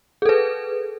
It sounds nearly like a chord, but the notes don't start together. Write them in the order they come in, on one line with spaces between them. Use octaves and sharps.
G#4 A4 B4